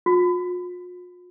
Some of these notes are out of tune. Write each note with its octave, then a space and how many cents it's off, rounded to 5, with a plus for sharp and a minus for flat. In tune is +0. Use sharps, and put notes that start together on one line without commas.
F4 +45